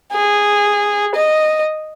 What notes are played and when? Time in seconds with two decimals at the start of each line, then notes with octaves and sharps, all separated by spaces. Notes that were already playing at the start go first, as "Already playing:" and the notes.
0.12 G#4
1.15 D#5